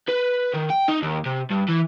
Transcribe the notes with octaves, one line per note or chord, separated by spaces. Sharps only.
B4
D#3
G5
D#4
D#2
C3
G2
E3